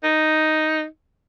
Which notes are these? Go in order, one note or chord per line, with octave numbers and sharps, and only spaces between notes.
D#4